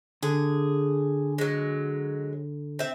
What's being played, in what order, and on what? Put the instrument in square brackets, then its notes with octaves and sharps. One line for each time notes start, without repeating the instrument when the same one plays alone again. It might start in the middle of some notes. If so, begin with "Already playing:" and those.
[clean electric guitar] D3 [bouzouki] G#4
[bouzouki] F#3 G#3
C4 E5